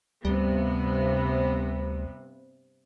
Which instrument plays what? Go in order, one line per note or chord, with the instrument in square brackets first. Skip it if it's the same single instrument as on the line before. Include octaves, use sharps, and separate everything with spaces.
[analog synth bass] D2 [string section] G2 C3 B3 [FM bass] G3